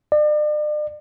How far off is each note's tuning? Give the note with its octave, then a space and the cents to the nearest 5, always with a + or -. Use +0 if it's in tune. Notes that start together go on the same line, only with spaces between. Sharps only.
D5 +40